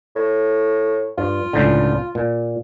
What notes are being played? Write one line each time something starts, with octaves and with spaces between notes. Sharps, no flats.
A2
G2 F4
C#2 A2 D3
A#2